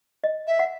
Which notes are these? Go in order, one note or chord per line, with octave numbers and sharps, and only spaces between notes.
D#5
E5
F#5